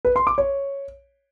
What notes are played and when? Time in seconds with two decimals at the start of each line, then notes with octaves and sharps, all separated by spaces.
0.05 B4
0.16 C6
0.27 D6
0.38 C#5